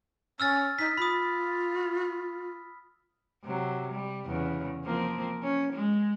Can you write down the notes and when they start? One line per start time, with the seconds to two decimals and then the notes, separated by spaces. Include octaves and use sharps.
0.40 C#4 E6 F6 A6
0.79 D#4 B6
0.97 F4 B5 D#6
3.45 C3 F#3
3.92 G3
4.26 E2 C#3
4.85 F3 A#3 C4
5.43 C#4
5.73 G#3